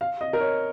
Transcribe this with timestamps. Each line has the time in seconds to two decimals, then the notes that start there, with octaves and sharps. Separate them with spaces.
0.01 F5
0.21 D#5
0.33 A#4
0.40 C#5